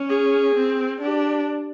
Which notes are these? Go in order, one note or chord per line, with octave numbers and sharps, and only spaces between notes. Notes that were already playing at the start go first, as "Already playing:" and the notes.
Already playing: C#4
G#4
C4
D4 G4